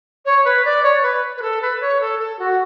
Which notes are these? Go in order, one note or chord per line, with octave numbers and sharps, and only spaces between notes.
C#5
B4
D5
C#5
B4
B4
A4
B4
C#5
A4
A4
F#4